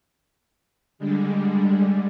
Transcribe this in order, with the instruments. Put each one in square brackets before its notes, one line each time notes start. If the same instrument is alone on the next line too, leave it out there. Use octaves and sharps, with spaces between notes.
[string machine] D3 G3 G#3